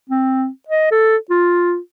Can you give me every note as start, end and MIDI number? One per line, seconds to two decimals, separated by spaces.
0.10 0.48 60
0.68 0.88 75
0.91 1.16 69
1.30 1.77 65